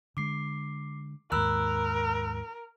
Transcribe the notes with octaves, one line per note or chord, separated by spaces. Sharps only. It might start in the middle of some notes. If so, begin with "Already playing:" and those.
D3 G#3 D6 C7
D#2 G#2 A#4 B5 E6 F#6